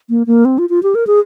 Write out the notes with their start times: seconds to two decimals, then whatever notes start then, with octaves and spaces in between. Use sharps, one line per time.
0.10 A#3
0.27 A#3
0.45 C4
0.58 F4
0.70 F4
0.83 G4
0.95 A#4
1.07 G#4